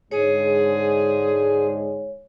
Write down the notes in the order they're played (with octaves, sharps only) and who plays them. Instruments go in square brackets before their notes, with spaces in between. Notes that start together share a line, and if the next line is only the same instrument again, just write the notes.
[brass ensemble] G#2 D3 G#3 [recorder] G#4 [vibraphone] C#5